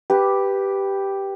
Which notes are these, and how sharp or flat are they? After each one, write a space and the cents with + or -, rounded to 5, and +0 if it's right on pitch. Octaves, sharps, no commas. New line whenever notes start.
G4 +0 B4 +0